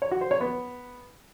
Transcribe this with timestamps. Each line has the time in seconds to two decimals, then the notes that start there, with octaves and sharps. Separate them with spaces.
0.02 C#5
0.11 F#4
0.21 C5
0.31 C#5
0.41 B3